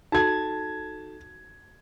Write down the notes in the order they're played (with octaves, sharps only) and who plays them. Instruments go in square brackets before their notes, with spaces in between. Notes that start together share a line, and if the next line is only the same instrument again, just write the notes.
[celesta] D#4 F#4 A4 [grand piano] A5 G#6